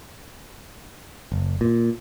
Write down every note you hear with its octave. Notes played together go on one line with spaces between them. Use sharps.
F#1
A#2